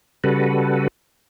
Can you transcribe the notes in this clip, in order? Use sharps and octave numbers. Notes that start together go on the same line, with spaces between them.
C#3 G3 F#4 A4 B4